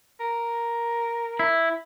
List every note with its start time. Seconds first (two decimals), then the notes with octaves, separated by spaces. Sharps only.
0.20 A#4
1.39 E4